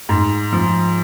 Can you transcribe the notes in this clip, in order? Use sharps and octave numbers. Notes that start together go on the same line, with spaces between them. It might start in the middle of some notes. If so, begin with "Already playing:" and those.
G#2
F3